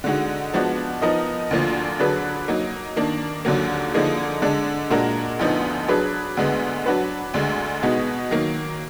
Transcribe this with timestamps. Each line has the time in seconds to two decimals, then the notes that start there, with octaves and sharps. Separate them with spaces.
0.04 D3 G#3 D#4 F#4
0.54 F3 G#3 B3 D4 F#4
1.02 F3 B3 D#4 A#4 D#5
1.51 D2 D3 F3 A#3 F4
2.00 D3 F#3 D4 G#4 B4
2.48 F#3 A#3 D#4
2.96 D#3 A#3 D4
3.45 D#2 D3 F#3 A#3
3.94 D3 F3 A#3 D#4 G#4
4.42 D3 G#3 D4
4.90 A#2 G#3 D4 F#4 A#4
5.39 D2 D3 F3 B3 D#4
5.88 F#3 D4 G#4 B4
6.37 D2 D3 G#3 B3
6.86 F#3 D4 F#4 B4
7.34 D2 D3 G#3
7.83 B2 G#3 B3 D#4
8.31 D#3 F#3 A#3